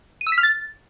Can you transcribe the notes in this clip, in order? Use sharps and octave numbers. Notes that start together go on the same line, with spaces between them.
D#7
E6
B6
F6
A6